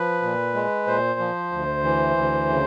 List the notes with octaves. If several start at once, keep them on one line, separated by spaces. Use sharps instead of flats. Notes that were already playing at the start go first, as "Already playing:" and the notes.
Already playing: F3 B4
A#2
G#3
A#2 C5
F3
D2
E3
D2
C#3